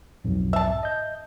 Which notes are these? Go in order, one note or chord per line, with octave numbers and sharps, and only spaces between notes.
B1 F2 G#2
E5 A5
D#5 G6